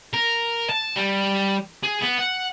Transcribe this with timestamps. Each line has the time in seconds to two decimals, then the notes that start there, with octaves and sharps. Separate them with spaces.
0.14 A#4
0.70 A5
0.96 G3
1.84 G#4
2.02 B3
2.19 F#5